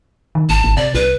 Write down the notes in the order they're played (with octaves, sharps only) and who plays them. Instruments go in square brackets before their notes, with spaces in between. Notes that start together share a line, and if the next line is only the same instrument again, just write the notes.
[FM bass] D#3
[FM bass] G#1 [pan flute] A5
[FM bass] G#1
[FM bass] C3 [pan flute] D5
[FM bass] C2 [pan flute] B4